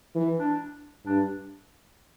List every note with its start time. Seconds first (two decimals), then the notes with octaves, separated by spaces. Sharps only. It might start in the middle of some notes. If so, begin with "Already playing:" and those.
0.15 E3
0.39 D4
1.06 G2 D4